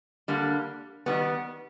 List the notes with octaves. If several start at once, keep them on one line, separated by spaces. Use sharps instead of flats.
D3 G3 A#3
D#3 G3 B3